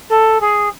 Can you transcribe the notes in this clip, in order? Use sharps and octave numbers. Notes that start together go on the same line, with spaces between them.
A4
G#4